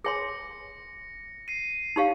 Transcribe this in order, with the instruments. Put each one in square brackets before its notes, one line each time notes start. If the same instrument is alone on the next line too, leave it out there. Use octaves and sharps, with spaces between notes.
[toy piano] G#4 C#5 G#5 C6 [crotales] A#6 C#7
[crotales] C7 D#7
[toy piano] D#4 G4 C#5 F5